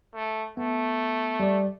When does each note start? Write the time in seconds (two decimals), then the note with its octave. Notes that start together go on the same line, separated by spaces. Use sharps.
0.14 A3
0.57 A3 B3
1.40 G3 D5